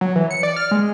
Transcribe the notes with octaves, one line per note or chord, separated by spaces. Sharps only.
F#3
E3
C#7
D5
F6
G#3